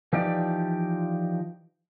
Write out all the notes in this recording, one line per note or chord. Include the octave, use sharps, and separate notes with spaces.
E3 F3 D#4 G4 D5